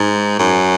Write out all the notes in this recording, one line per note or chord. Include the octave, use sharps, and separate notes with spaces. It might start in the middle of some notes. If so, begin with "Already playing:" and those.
Already playing: G#2
F#2